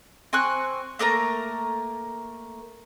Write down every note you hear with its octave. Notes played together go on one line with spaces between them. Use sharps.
C4 G#5 C#6 F#6
A3 A#3 A#4 A#5